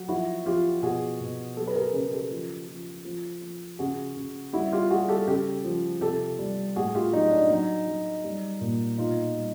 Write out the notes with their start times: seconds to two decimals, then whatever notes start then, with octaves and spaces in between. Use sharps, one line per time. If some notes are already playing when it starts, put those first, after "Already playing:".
Already playing: F#3
0.08 F3 E4 F#4
0.46 F3 F4 G4
0.82 B2 F#4 G#4
1.20 B2
1.57 F#3 G4 A4
1.67 B4
1.75 G#4 A#4
1.93 C#3 G#4 A#4
2.12 G4 A4
2.31 F3
2.68 F3
3.05 F3
3.42 F3
3.79 C#3 F#4 G#4
4.16 C#3
4.53 G3 E4 F#4
4.73 F4 G4
4.90 G3 F#4 G#4
5.09 G4 A4
5.28 C#3 G4 A4
5.64 F3
6.01 C3 G4 A4
6.39 G3
6.76 A2 F#4 G#4
6.95 F4 G4
7.13 F#3 D#4
7.31 D4
7.50 F#3 D#4
7.87 F#3
8.24 G3
8.61 A#2
8.98 B2 D#4 F4
9.36 G3